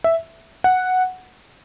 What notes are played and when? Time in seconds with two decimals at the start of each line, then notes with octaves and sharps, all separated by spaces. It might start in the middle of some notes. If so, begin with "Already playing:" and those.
0.04 E5
0.64 F#5